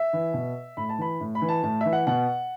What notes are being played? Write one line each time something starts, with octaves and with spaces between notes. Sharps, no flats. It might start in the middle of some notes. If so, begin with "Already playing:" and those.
Already playing: E5
E3
B2
A2 B5
A5
E3 B5
A2
B5
E3
A5
A2 A5
E3 E5
F#5
B2 F#5